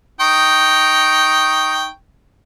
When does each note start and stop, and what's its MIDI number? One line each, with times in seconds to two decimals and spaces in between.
0.21 1.87 63
0.21 1.87 79
0.21 1.87 85